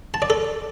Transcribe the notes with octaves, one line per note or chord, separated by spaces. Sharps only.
A5
D5
A4